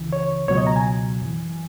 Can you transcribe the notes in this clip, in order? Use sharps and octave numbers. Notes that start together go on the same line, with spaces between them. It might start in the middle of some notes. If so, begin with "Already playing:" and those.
Already playing: C#2 C#3 E3
C#5
C#2 B2 F#3 C#5
D#5
A#5
G#5
F#2 E3